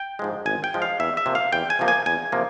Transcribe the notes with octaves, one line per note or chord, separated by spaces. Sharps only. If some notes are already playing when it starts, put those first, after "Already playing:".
Already playing: G5
G#2 F3 G#3
G#1 G#5
G5
G#2 F3 G#3
F5
E2 E5
E5
C3 F3 A#3
F5
E2 G5
G#5
C3 F3 A#3
G#5
E2 G#5
C3 F3 A#3